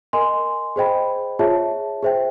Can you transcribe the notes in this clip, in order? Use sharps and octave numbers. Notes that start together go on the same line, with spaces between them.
A#4 D#5 G#5 C6
G#4 C5 D#5 G5 B5
F4 G#4 C#5 E5 A5
G#4 C5 E5 G5